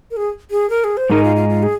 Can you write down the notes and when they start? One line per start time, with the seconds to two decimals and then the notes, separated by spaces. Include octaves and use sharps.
0.11 A#4
0.17 G#4
0.51 G#4
0.70 A#4
0.84 G#4
0.97 C5
1.10 G#2 G#3 D#4 A#4
1.24 F4
1.36 F4
1.49 F4
1.63 G#4